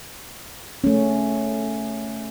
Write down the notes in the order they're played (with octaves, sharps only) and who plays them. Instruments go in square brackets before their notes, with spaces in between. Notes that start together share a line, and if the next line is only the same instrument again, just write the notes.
[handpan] A3 C#4